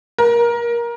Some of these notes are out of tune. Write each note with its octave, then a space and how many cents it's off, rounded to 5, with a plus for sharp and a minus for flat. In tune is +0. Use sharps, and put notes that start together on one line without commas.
A#4 +20